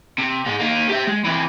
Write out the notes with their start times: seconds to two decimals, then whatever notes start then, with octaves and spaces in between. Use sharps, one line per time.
0.18 C3
0.46 G#2 G#3
0.60 A#3 D#4
0.89 G4 E5
1.07 G#3
1.25 C3 E3